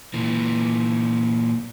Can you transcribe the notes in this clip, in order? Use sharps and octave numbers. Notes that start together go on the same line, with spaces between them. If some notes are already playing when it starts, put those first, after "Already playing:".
A#2 E3